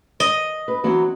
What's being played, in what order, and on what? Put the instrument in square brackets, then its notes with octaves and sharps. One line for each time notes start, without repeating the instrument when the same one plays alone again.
[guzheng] D#5
[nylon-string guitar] B4
E3 F#3 C4